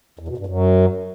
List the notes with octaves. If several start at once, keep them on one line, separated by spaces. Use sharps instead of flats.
E2
B2
G2
F#2